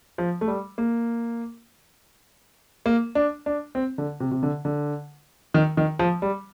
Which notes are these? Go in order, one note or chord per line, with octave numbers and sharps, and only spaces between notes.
F3
A3
G3
A#3
A#3
D4
D4
C4
D3
C3
C3
D3
D3
D#3
D#3
F3
G3